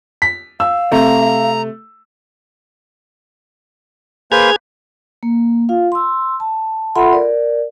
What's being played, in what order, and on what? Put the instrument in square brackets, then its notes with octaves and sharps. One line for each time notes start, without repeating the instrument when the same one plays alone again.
[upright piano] B6
[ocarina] F5 [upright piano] E6
[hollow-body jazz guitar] C3 [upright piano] A3 [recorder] A#5
[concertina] A#3 B4 C5 [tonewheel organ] G#4 F6 G#6
[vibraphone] A#3
F4 F5
C6 E6
A5
F4 A4 E5 F#5 B5 C6
A#4 D5